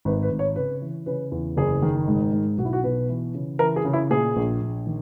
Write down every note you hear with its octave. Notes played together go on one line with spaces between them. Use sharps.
G#1 B4
B4
G#1
C#5
C#3 B4
E3
C#3 B4
E2
F#1 G#4
D#3
G#2
G#2
B1 F#4
E4
F#4
B2 B4
E3
C#3
E3 A#4
G#4
C#3
E4
A#2 G#4
A#1
A#1
D#3